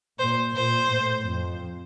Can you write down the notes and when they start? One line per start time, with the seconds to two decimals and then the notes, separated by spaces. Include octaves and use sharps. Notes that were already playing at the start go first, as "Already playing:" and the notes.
0.19 A#2 C5
0.55 A#2 C5
0.91 A2
1.27 F2